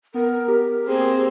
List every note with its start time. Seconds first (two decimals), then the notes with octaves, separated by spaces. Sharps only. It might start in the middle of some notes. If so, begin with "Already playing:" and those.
0.14 B3 A#4
0.48 G4
0.87 A#3 C4 G#4